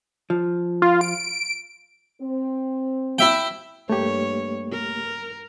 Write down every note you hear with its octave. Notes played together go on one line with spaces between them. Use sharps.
F3
F4
D7
C4
E4 E5 G5
G2 A3 A#3 G4 C#5
A#4